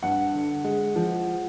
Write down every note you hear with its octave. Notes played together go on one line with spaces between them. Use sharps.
G2 F#5
D3
G#3
F3